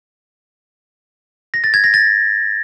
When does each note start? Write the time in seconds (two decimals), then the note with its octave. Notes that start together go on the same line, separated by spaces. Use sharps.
1.54 A#6
1.64 A6
1.74 G#6
1.84 A#6
1.94 A6